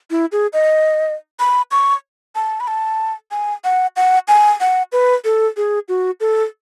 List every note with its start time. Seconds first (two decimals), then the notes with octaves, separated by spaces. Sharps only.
0.11 E4
0.32 G#4
0.53 D#5
1.39 B5
1.71 C#6
2.35 A5
2.60 B5
2.68 A5
3.31 G#5
3.64 F#5
3.96 F#5
4.28 G#5
4.60 F#5
4.92 B4
5.24 A4
5.57 G#4
5.88 F#4
6.20 A4